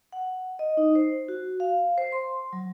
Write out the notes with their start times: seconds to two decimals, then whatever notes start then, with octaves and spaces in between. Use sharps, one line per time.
0.12 F#5
0.59 D#5
0.77 D#4
0.95 C5
1.28 F#4
1.60 F5
1.98 C5
2.12 C6
2.53 F#3